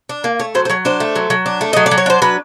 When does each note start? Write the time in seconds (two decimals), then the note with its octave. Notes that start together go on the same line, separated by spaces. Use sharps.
0.09 D4
0.24 A#3
0.39 A3 C#5
0.55 F#3 C5
0.65 C5
0.69 F#3 C#5
0.85 D4 C5
1.00 A3
1.16 F#3
1.30 F#3
1.46 D4
1.61 A3
1.73 F#3 D#5
1.86 D5
1.91 F#3
1.98 C#5
2.06 D4 C5
2.22 F#3 B4